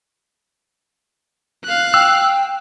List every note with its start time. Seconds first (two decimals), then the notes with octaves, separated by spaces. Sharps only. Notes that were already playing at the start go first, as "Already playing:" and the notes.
1.64 F5 F#6
1.94 G5 E6